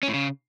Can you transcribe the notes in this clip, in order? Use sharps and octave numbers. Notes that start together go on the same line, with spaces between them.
C#4
A2
C#3